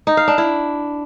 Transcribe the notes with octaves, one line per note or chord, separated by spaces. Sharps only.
D#4
F5
D4
E4